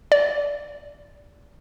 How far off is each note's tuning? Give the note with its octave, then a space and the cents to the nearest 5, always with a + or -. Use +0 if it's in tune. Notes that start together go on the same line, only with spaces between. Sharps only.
D5 -25